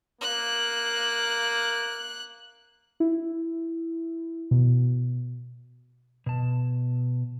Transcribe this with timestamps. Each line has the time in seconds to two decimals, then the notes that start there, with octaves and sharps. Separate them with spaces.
0.21 A#3 F#6
3.00 E4
4.51 B2
6.26 B2 A5